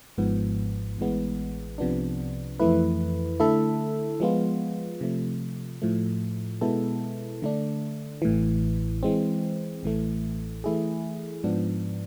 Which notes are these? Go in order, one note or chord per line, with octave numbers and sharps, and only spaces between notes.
G#1 G#2 F3 B3
A1 A2 E3 G#3 B3
C2 C3 F3 B3 D4
F2 E3 A3 E4 B4
D3 A3 E4 A4 E5
F3 G#3 B3 F4
C3 F3 A3
A2 F3 A3
B2 G#3 B3 E4 A4
D3 A3 D4
A1 A2 E3
E3 G#3 C4
A1 A2 E3 A3
E3 A3 E4 G#4
G#2 F3 B3 D4